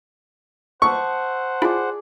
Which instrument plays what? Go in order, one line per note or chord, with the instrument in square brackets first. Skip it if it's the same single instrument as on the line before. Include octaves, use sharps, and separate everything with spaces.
[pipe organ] C5 F#5 [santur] E5 A5 D#6 [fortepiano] C#6
[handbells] E4 F4 [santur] G#4 D5